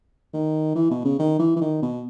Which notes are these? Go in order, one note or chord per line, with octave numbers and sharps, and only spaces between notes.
D#3
E3
B2
C#3
D#3
E3
E3
D#3
B2